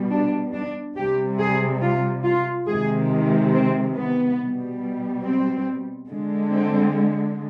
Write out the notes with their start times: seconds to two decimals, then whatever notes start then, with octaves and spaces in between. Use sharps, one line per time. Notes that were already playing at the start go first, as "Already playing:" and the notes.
Already playing: B2 G3
0.10 D4
0.53 D4
0.96 C3 G3 G4
1.39 G#4
1.81 F4
2.24 F4
2.67 C3 D#3 G#3 G#4
3.52 C4
3.96 B3
4.38 B2 G3
5.23 C4
6.09 D3 G#3
6.52 C4